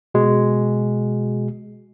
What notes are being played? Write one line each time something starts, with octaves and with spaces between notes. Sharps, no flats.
B2 G#3 F#4